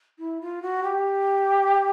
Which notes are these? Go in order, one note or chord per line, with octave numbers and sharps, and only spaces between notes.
E4
F4
F#4
G4